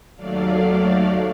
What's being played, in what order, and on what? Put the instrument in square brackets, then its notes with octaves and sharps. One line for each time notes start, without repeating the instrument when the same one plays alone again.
[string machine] D#2 F#3 A3 D5 F5